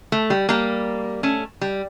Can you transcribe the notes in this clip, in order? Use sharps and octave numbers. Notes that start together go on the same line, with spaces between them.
A3
G3
G3 A#3
A3 C#4
G3